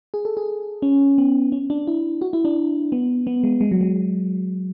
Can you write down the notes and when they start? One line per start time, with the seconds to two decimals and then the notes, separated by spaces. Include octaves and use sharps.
0.14 G#4
0.25 A4
0.37 G#4
0.82 C#4
1.18 B3
1.52 C#4
1.70 D4
1.87 E4
2.21 F#4
2.33 E4
2.45 D4
2.92 B3
3.27 B3
3.43 G#3
3.61 G#3
3.71 F#3
3.81 G#3